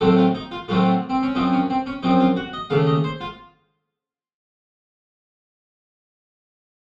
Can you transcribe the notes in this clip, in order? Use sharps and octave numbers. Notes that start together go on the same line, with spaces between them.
A2 F#3 A3 C4 A4
F4
D#4
F4
A2 F#3 A3 C4 F4
C4
C#4
F#2 F3 C4 D#4
C#4
C4
C#4
F#2 F3 C4 D#4
F4
F#4
D#5
D#2 C#3 A3 F5
D#5
C5
F4